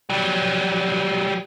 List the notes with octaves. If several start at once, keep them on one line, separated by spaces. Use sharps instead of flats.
F#3 G3